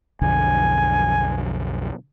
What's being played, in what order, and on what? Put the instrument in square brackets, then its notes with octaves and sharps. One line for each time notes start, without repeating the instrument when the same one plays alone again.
[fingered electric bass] B1 F2 D3 [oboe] G#5